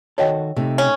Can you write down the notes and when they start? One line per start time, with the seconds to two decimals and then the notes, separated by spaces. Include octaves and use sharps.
0.18 D#3 F#4 A4 C#5 D#5 G5
0.56 C3 A3 D#4
0.78 C#4